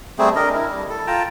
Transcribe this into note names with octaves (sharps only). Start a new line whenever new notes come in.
G3 A3 C4 G#4
D4 A#4 D#5
E4
G3
A4
F4 G5 A5 A#5